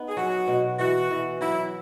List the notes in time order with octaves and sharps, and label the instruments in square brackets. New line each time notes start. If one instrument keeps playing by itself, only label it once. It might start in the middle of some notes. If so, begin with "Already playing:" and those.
Already playing: [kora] B3 D#4
[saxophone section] G#4
[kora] F#3 [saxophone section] F#4
[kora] B2
[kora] E3 [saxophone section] F#4
[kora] E3
[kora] F#3 [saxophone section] E4